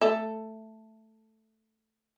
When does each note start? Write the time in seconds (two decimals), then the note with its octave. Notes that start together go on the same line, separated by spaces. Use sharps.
0.01 A3 A4 E5